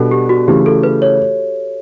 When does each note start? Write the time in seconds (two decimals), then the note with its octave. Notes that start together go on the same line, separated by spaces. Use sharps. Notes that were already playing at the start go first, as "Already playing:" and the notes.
Already playing: B2 G3 B3 D4 A4
0.11 G4
0.29 F#4
0.48 C#3 E3 A3 G4
0.66 A4
0.83 B4
1.02 C#5